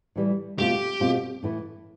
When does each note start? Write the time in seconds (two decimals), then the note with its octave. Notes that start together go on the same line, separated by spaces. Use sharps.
0.16 A2 E3 G3
0.58 B2 A3 C4 F4 G4
1.00 B2 A3 C4 F4
1.43 A2 E3 A3 E4